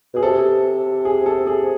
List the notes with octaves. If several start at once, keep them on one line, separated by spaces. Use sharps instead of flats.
B2 G#4
C3 A4
G#4
A4
G#4